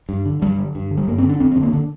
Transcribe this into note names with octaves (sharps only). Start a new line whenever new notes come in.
G2
D3
G2 G3
D3
G2
D3
G3
G2 A#3
C4
D3 D4
F2 C4
C4
D3
A#3
D3